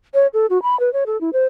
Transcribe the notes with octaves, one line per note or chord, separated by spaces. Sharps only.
C#5
A4
F#4
B5
B4
C#5
A4
E4
C5